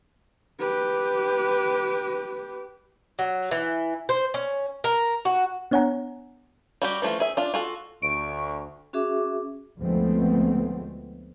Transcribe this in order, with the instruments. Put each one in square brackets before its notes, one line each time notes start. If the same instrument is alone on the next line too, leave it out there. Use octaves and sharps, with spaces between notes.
[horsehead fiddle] G4 B4
[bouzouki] F#3
E3
C5
C#4
A#4
F#4
[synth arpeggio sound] B3 D4 C#5 F#5 G#5 A#5
[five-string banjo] G3 F#4 G4
E3 F3 A3 F4
G#4 E5
D4 F4
F4 F#4 A4
[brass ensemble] D2 [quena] C#6 [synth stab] D7
[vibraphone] C#4 F#4 G#4 E5 D6
[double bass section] D2 F3 G#3 A3 B3 C4